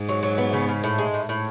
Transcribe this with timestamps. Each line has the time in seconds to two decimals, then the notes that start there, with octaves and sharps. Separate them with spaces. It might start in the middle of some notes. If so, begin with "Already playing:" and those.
Already playing: G#2
0.09 F#3
0.23 F#3
0.38 B3
0.53 C#3
0.68 C#3
0.84 A2
0.98 G#3
1.14 A2
1.29 A2